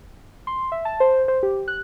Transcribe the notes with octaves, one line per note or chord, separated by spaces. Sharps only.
C6
E5
A5
C5
C5
G4
F#6